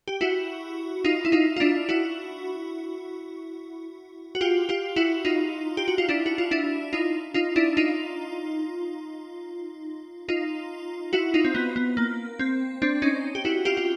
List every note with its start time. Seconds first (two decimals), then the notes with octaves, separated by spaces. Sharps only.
0.08 G4
0.21 E4 F#4
1.04 D#4 F4
1.25 E4
1.32 D#4 F4
1.56 F4
1.60 D4 E4
1.89 E4 F#4
4.35 F#4
4.41 F4 G4
4.69 F4 G4
4.96 E4 F#4
5.25 D#4 F4
5.77 G4
5.88 F#4
5.98 F4
6.09 D4 E4
6.26 F#4
6.38 F4
6.51 D4 E4
6.93 D#4 F4
7.34 D#4 F4
7.56 D4 E4
7.77 D#4 F4
10.29 D#4 F4
11.13 E4 F#4
11.34 D#4 F4
11.45 C4
11.55 B3
11.76 B3
11.97 A#3
12.39 C4
12.82 C4 D4
13.02 C#4 D#4
13.35 G4
13.45 E4 F#4
13.65 F4 G4
13.77 F4